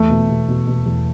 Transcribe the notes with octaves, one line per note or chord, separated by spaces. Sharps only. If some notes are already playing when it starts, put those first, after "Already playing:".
Already playing: E2 A3
B2
B2
B2
B2
E2